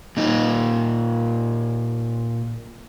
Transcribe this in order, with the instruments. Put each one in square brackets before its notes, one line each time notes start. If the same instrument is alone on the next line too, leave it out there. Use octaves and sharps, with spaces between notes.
[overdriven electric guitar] A#2 D#4